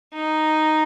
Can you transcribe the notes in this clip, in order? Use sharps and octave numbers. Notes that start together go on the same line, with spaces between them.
D#4